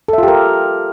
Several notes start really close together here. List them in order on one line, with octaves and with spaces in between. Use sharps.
A4 E5 F4 G4 A#4